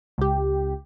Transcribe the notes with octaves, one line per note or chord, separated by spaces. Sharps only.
C#2 G4